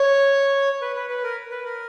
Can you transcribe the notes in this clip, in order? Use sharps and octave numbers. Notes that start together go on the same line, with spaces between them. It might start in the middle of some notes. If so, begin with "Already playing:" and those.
Already playing: C#5
B4
B4
B4
A#4
B4
A#4